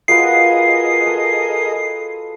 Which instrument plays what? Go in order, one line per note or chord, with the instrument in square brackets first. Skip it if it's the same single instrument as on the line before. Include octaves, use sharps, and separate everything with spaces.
[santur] F4 F#4 B4 [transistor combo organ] G#4 A#4 D#5 [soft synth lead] C7
[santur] A4